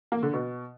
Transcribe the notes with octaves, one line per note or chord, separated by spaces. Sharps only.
A#3
D3
B2